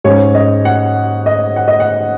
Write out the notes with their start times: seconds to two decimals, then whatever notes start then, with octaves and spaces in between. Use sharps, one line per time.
0.04 G#2 G#3 C#4 C#5
0.35 D#5
0.65 F#5
1.26 D#5
1.56 F#5
1.68 D#5
1.80 F#5